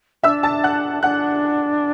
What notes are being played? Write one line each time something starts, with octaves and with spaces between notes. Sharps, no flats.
D4 E5 E6
A5 A6
F#5 F#6
D4 F#5 F#6